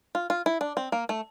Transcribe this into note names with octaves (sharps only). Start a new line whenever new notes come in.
F4
F4
E4
D4
C4
A#3
A3